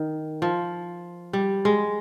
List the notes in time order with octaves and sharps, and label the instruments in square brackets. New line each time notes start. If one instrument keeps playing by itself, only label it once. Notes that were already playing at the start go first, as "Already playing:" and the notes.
Already playing: [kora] D#3
F3
G3
G#3